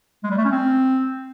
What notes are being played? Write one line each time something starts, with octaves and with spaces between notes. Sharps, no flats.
G#3
G3
A3
C#4
C4